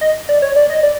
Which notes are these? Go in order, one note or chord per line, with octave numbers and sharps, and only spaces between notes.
D#5
D5
C#5
D5
D#5
D5